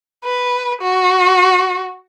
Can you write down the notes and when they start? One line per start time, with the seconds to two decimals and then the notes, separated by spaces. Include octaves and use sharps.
0.25 B4
0.82 F#4